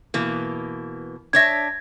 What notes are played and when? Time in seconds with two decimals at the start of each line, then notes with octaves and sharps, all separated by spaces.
0.14 B2 E3 A#3
1.33 D4 C#5 E5 G#6 A#6